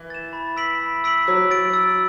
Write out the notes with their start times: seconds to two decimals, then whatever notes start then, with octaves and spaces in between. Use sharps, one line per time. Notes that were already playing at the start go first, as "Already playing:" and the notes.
Already playing: E3
0.10 A6 E7
0.33 B5
0.57 E6 B6 D7 F#7
0.80 B5
1.04 E6 B6 D7 F#7
1.27 F#3 E6
1.51 A6 D7
1.74 E6